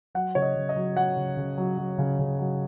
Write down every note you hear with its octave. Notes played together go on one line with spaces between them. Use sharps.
F#3 F#5
C#3 C#5
D#5
C#3
D#5
F#3
F#3 F#5
C#3
C#3
F#3
F#3
C#3
C#3
F#3